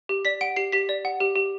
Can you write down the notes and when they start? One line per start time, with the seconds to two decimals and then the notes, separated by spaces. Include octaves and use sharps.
0.09 G4
0.25 D5 B6
0.41 F#5 D7
0.56 G4 C7
0.72 G4 B6
0.89 D5
1.05 F#5
1.20 G4
1.36 G4